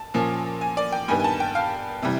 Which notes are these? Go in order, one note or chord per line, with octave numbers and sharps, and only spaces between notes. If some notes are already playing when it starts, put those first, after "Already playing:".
Already playing: A5
A#2 F3 A#3 C#4
G#5
D5
G5
G2 D#3 G3 B3 G#5
G#5
A5
G5
F5
C3 E3 G3